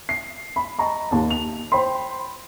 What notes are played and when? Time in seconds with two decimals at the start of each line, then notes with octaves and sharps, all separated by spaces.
0.09 C7
0.56 B5
0.79 D#5 A5 A#5 C#6
1.11 D#2 A5
1.30 F7
1.72 C5 G5 B5 C6